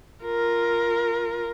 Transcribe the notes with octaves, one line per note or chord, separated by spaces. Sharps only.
F4 A#4